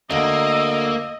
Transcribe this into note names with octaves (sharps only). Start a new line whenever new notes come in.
D2 A#3 D#5 E6